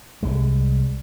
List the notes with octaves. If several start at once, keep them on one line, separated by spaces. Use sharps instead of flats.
C2 G3 G#3